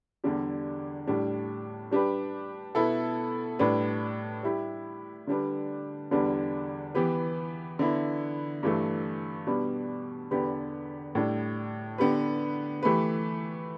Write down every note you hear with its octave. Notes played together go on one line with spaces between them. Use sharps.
E2 D3 G3 D4 G4
A2 G3 D4
G3 D4 G4 B4
B2 B3 E4 A4
A2 G3 D4 B4
G3 E4 G4
D3 G3 D4 B4
E2 D3 G3 D4 B4
E3 B3 G4 B4
D3 B3 E4
G2 E3 A3
B2 G3 D4 B4
E2 D3 B3 G4 B4
A2 G3 D4
D3 B3 G4 B4
E3 A3 G4 B4